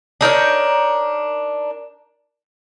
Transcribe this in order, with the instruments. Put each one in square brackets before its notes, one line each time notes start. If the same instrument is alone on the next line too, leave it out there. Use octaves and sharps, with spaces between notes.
[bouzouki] D4 D#4 A#4 C#5